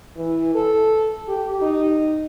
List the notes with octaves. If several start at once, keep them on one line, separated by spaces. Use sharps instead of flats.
E3
A4
G4
D#4